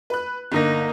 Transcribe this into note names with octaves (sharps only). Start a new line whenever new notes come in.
B4 F#6
G1 D3 A#3 D#4 A#6